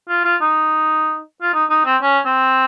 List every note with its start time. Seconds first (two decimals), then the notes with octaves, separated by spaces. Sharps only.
0.09 F4
0.25 F4
0.41 D#4
1.42 F4
1.54 D#4
1.70 D#4
1.86 C4
2.02 C#4
2.26 C4